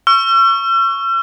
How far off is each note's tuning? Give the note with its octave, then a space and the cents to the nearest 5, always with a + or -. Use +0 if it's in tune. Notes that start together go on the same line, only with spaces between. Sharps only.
C#6 +0 E6 +45